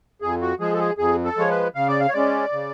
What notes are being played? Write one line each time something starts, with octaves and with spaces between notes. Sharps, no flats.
F2 G#4
F#4
F3 G#3 G#4
A4
G#4
F2 G#4
A4
F3 G#3 C#5
B4
C#3 F5
D5
F5
C#5
G#3 C#4 D5
C#3